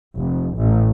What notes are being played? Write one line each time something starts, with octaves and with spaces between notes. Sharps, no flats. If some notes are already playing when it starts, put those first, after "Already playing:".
F1
A1